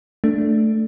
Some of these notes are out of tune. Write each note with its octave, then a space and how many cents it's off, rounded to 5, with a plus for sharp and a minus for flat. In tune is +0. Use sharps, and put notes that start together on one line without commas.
A3 +0 D4 +0